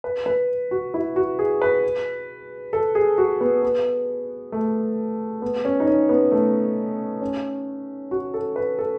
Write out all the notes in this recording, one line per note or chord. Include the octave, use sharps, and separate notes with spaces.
B4
B4
F#4
E4
F#4
G#4
B4
A4
G#4
F#4
B3
B3
A3
B3
C#4
D#4
C#4
B3
A3
C#4
F#4
A4
B4
A4